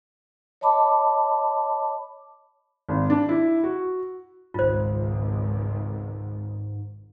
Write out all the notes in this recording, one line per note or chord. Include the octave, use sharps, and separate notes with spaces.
C#5 D#5 A5 B5 D6
G#1
D4
E4
F#4
G#1 C#2 G#2 F4 C5